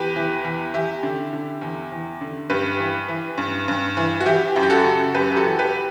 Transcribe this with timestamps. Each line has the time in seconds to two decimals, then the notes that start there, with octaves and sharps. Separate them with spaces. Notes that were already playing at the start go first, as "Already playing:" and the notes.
Already playing: E2 G4 B4
0.16 E3
0.45 E2
0.73 E2 E4 G4
1.03 D3
1.33 D3
1.61 E2
1.92 E2
2.21 D3
2.50 G2 G4 B4
2.79 E3
3.09 E3
3.38 G2
3.68 G2
3.97 E3
4.21 F#4
4.26 E3 E4 G4
4.56 F#2
4.63 G4
4.70 F#4 A4
4.84 C#3
5.14 F#2 G4 B4
5.32 G4
5.37 F#4 A4
5.44 E3
5.59 G4 B4